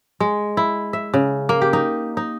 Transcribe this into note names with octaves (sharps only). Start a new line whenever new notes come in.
G#3
E4
E5
C#3
A#3
G4
D#4
D#4